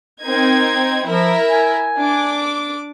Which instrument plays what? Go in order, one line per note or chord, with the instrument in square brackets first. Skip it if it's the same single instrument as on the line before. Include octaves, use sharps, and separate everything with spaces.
[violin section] C4 D#4 G#6 [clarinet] A#4
[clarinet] F3 [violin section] E4 A#4 E5
[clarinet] G#5
[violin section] D4 D6